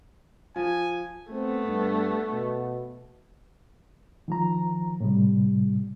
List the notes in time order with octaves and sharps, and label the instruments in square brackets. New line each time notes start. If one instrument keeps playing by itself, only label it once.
[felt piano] F3 [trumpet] G#5
[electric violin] A3 B3 [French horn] C4
[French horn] G2
B2
[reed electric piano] D#3 F3 A#5
A2 C3 G3